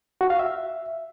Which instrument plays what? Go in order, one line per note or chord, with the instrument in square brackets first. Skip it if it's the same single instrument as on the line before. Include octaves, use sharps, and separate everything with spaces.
[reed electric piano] F#4
F5
E5